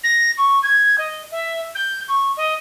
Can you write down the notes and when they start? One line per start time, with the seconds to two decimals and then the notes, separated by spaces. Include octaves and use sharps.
0.03 A#6
0.37 C#6
0.63 G#6
0.98 D#5
1.31 E5
1.75 G6
2.08 C#6
2.36 D#5